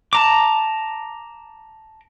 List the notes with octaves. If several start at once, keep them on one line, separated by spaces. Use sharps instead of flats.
A5 A#5 D6